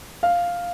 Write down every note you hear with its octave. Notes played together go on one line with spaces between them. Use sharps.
F5